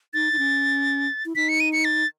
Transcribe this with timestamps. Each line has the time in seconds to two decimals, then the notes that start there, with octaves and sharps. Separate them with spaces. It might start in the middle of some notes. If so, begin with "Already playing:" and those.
0.14 D#4 A6
0.33 D#4
0.39 C#4
1.25 E4
1.36 D#4 B6
1.49 C#7
1.60 D#7
1.73 C#7
1.85 A6